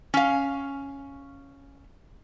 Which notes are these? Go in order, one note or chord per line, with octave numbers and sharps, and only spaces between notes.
C#4 F5